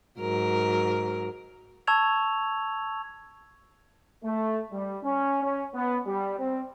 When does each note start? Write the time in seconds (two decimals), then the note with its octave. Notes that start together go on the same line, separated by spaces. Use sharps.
0.20 G#2 F#3 A#4
1.87 A5 C#6 E6 G#6 F7
4.24 A3
4.72 G3
5.03 C#4
5.43 C#4
5.74 B3
6.07 G3
6.39 C4